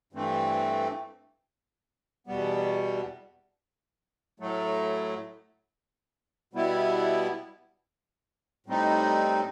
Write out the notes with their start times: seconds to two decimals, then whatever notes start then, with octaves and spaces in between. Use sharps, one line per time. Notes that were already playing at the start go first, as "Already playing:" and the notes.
0.13 G2 E3 A3 C4
2.27 E2 B2 G3 B3
4.39 A2 F#3 A3
6.53 B2 G3 B3 E4
8.66 A2 G3 C4 D#4